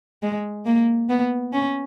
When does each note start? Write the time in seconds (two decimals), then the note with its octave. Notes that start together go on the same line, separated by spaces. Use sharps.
0.22 G#3
0.66 A#3
1.09 B3
1.53 C#4